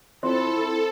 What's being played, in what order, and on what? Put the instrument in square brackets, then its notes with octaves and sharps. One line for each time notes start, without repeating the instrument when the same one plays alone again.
[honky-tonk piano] C4 [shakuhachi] E4 [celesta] F4 C5 C6 [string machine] A4